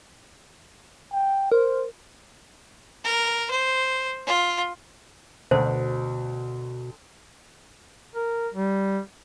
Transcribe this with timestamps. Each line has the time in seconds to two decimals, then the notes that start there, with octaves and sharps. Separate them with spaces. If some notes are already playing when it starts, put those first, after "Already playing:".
1.12 G5
1.52 A#4 C5
3.04 A#4
3.51 C5
4.26 F4
5.51 D2 B2 C5
8.15 A#4
8.54 G3